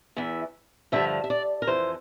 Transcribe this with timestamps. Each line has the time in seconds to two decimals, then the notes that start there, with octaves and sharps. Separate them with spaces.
0.17 E2 E3 E5
0.92 G2 D3 F3 E5
1.24 E5
1.30 D5
1.62 A#4
1.67 F2 E3 C5